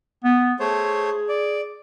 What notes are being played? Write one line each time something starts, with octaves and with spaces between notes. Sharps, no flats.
B3
A3 G#4 C5 C#5
D5